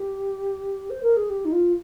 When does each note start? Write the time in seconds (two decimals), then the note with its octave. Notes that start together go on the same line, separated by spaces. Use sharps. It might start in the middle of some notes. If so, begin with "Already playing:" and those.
Already playing: G4
0.90 C5
1.03 A#4
1.17 G#4
1.30 G4
1.45 D#4
1.52 F4